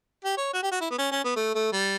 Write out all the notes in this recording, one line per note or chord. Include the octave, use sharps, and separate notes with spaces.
G4
C#5
F#4
G4
F#4
E4
B3
C#4
C#4
B3
A3
A3
G3